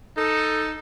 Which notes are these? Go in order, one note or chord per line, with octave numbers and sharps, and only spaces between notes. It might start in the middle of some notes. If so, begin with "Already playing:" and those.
D#4 A4